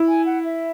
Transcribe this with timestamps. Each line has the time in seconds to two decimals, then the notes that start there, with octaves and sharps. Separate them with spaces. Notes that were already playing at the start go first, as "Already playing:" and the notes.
Already playing: E4
0.08 G#5
0.26 F#5
0.44 E5